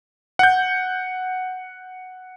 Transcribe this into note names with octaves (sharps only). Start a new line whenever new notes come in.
F#5 G6